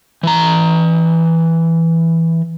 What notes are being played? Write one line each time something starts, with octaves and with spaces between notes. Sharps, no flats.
E3 A#5